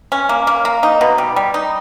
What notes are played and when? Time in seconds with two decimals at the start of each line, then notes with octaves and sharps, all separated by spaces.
0.12 C#4
0.29 A#3
0.47 A#3
0.65 A#3
0.83 D#4
1.01 B2
1.18 G3
1.36 G3
1.54 D#4